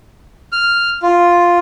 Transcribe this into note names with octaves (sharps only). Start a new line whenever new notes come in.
F6
F4